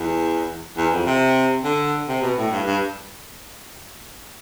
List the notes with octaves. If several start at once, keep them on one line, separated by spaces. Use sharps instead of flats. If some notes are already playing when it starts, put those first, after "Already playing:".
Already playing: E2
E2
F2
C3
D3
C3
B2
A2
G2
G2